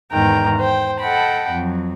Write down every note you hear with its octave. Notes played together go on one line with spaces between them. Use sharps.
E2 G#2 D#3 G5 A#5
C5 G5
A4 D#5 F#5 G5 A5 B5
F2 F#3